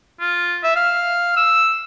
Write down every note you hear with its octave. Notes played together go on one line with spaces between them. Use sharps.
F4
E5
F5
E6